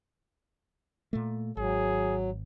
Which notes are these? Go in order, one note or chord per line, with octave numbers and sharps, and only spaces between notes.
A#2 A3
G#1 F#3 G#4